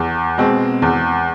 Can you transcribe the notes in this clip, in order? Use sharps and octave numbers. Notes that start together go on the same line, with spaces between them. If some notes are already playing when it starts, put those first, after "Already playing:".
Already playing: E2
B2 G#3 C4
E2